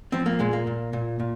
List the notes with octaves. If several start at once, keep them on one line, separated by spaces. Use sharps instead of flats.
F3 C4
A#3
A#2 G#3
A#3
A#2
A#2
A#2